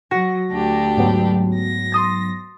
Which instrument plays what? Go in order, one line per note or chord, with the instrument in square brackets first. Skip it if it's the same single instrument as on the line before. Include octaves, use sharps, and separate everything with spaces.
[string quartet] F#3 [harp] F#4 [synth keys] A#6
[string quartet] D2 D4 G4
[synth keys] G#2 F#3 B3
[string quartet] A#6
[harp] C6 D#6 A6